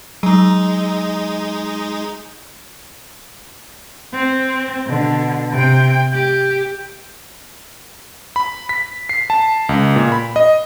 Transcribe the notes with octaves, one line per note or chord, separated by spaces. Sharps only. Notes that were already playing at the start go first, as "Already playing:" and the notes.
F#3 G#3 D#4
C4
B2 D3
C3 G5
G4
B5
B6
C7
A5
C#2
A#2
B5
D#5